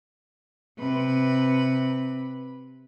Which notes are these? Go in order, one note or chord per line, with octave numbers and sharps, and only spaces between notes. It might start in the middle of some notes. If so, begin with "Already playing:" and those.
C3 B4